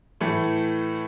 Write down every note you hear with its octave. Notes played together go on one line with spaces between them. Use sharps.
A2 E3 A3